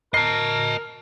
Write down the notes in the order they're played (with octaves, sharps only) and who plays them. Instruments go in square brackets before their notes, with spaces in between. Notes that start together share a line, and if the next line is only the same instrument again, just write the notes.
[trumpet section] A#4 [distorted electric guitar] D#5 A5 [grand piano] C7